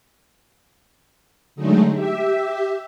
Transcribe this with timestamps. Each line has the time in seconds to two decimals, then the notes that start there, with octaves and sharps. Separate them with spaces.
1.56 D3 F#3 G#3 A3 D#4
1.93 G4 E5